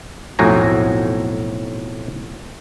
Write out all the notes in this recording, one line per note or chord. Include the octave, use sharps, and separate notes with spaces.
B1 F2 A2 F#4 G#5 A#5